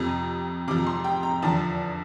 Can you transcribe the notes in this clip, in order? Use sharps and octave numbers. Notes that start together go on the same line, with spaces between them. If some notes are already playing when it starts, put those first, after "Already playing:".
Already playing: F2 C3 F3 A#5
F2 C3 F3 D6
A#5
C6
G5
A#5
E2 D3 F3 A5